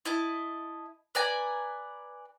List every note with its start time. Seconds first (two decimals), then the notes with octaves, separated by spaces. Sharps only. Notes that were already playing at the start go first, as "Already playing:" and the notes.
0.05 E4 D#5 A5
1.15 B4 D5 G#5 A#5